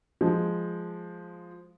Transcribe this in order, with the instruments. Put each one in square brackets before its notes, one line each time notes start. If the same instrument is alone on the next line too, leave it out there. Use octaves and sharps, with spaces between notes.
[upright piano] F3 G#3